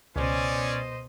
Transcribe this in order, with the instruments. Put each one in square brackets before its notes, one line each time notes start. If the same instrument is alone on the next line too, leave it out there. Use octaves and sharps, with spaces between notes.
[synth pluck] C#2 [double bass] B2 [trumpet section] C#4 D5 [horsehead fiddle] C5 D#5